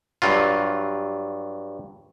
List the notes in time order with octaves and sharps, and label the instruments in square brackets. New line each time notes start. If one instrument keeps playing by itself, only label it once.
[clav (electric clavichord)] G2 F#3 F4